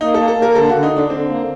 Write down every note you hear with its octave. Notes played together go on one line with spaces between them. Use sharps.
A#3 D#4
A#3 A4
A4
A#3
A#4
D3 A4
D3 F#4
D#4
D3
D4
D3 C4
A#3